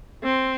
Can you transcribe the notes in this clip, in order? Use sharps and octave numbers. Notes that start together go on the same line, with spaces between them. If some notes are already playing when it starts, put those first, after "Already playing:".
C4